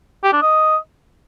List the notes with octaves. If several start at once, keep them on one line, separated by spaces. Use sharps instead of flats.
G4
D4
D#5